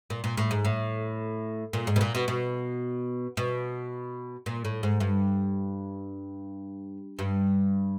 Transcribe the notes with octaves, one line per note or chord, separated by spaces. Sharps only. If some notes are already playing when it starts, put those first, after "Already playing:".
A#2
A#2
A2
G#2
A2
A#2
G#2
B2
A#2
B2
B2
B2
A#2
A2
G#2
G2
G2